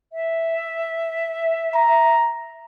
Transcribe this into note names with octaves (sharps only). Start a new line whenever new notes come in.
E5
A#5